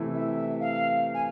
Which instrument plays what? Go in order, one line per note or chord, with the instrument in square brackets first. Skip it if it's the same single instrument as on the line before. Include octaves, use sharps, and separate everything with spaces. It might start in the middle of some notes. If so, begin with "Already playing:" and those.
Already playing: [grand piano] C3 E3 A3 E4
[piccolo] E5
F5
G#5